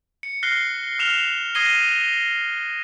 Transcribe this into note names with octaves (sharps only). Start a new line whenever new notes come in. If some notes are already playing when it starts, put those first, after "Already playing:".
C#7
F6 F#6 A#6 C7 G7
F6 E7 F7
D#6 G#6 A#6 C7 D#7 G7